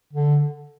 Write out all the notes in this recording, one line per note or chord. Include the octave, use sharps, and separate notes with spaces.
D3